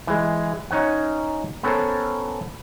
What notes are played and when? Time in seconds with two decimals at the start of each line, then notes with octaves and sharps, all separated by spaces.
0.07 E3 G#3
0.71 C#4 D#4 C#5 F#5
1.63 B3 C#4 A4 A#4 C5